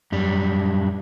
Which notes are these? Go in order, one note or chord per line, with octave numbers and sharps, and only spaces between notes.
F#2 G3